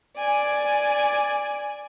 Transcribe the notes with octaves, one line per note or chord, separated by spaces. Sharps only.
D5 G#5